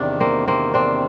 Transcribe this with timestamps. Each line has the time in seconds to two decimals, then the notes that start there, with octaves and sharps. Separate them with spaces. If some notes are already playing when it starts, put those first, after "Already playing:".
Already playing: E2 C3 D#3 D4
0.20 A#3 C4
0.48 A#3 C4
0.74 C4 D4